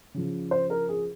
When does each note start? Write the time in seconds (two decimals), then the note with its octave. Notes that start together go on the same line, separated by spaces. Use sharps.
0.14 C#3 F3
0.51 C5
0.70 A#4
0.89 G#4